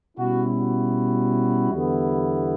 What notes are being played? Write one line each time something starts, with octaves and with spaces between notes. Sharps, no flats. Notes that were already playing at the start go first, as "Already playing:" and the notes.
B2 G3 C#4 E4 F#4
F#4
E2 D3 G3 B3 E4